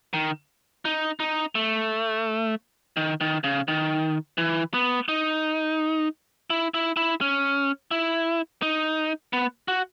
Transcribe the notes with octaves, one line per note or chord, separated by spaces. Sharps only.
D#3
D#4
D#4
A3
D#3
D#3
C#3
D#3
E3
B3
D#4
E4
E4
E4
C#4
E4
D#4
B3
F#4